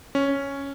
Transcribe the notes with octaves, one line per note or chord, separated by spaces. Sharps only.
C#4